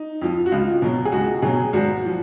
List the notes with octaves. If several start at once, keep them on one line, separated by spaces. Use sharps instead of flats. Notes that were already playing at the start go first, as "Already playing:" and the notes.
Already playing: D#4
F2 F3
F#4
C#2 F4
B2 F#3
G#4
C#2 F#4
B2 F#3 G#4
G#1 F#4
F3